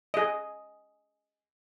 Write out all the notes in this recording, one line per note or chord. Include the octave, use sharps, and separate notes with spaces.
G#4 D#5